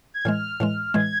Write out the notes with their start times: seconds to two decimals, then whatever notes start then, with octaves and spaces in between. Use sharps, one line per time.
0.14 G#6
0.25 A2 E3 G#3 F6
0.60 A2 E3 G#3
0.94 A2 E3 G#3 G#6